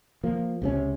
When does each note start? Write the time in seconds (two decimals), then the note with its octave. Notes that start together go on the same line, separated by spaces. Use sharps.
0.24 F3 A#3
0.62 C#2 C3 C#4